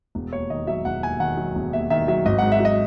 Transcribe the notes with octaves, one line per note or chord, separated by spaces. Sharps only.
E1
D#2 C#5
D#3 D#5
F#3 E5
E1 F#5
D#2 G#5
D#3 F#5
F#3
E1
D#2 E5
D#3 E5
F#3 E5
G#1 D#5
G#2 F#5
E5
F#3 D#5